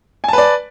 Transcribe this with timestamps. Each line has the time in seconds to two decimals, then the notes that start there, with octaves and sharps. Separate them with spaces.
0.24 G#5
0.28 A5
0.33 B4
0.38 D5